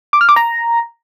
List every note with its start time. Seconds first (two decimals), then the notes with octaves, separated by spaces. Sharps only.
0.13 D6
0.21 F6
0.29 D6
0.36 A#5